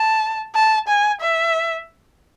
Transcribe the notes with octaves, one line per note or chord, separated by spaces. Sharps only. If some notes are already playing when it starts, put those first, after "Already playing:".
Already playing: A5
A5
G#5
E5